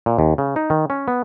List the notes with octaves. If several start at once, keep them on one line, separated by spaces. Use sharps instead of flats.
A#2
D#2
C#3
D#4
D#3
C#4
B3